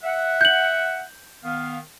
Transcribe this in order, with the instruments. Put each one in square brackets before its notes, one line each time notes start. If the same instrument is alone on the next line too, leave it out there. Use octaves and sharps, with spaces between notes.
[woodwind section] E5 F#5
[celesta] G6 F#7
[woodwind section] D#3 B3 F5